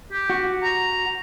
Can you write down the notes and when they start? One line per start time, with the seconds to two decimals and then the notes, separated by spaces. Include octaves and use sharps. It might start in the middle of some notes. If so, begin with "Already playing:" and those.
0.12 G4
0.30 F#4
0.63 A#5